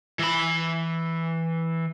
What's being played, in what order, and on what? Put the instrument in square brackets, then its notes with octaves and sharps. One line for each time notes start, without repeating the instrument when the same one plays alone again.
[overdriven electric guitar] E3 B5